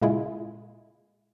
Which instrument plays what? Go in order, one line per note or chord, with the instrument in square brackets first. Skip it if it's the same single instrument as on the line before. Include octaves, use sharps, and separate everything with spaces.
[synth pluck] A#2 C#3 G#3 E4 F4 G#4